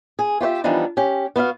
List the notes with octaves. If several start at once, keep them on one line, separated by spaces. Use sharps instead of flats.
G#4
F4 G4 C5 E5
E3 F3 G3 B3 D4 D#4
C#4 G4
B3 F#4 E5 F5